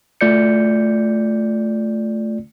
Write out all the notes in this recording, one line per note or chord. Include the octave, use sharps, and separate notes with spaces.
A3 F4 D5 G6 C#7